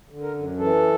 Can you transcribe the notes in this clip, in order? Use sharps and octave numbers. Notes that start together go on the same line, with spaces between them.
D3
A#4
F#2
E3 A4